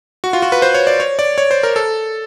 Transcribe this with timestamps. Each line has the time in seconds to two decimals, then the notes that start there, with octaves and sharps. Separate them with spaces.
0.24 F#4
0.33 F4
0.42 F#4
0.52 B4
0.62 C5
0.74 C#5
0.87 D5
1.00 C#5
1.19 D5
1.38 C#5
1.51 C5
1.63 A#4
1.76 A4